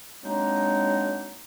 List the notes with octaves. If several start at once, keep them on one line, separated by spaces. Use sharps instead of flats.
F#3 G#3 A#3 C4 D4 D#4